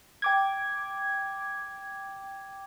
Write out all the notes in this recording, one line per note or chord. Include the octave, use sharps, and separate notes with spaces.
G5 D6 G#6